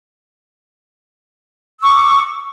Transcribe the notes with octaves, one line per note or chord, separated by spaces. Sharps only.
C#6 D6 E6